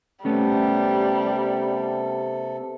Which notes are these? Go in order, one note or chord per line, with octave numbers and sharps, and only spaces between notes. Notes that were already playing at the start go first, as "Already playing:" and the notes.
C3 G3 A3 B3 C#4 A4